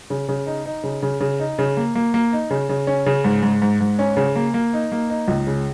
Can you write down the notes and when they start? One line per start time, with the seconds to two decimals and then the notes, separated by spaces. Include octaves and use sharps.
0.10 C#3
0.29 C#3
0.46 D#4
0.66 D#4
0.84 C#3
1.03 C#3
1.21 C#3
1.40 D#4
1.59 C#3
1.77 A#3
1.95 A#3
2.14 A#3
2.33 D#4
2.51 C#3
2.69 C#3
2.87 C#4
3.06 C#3
3.24 G#2
3.43 G#2
3.62 G#2
3.81 G#2
3.99 C#4
4.17 C#3
4.36 A#3
4.54 A#3
4.73 D#4
4.92 A#3
5.10 D#4
5.28 C#2
5.47 C#3